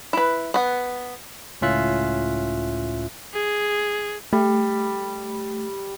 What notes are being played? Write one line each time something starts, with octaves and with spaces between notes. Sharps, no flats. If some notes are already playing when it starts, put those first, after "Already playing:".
E4 B4
B3 F#5
C#2 A2 C#4 F4 E5 F#6
G#4
G3 A3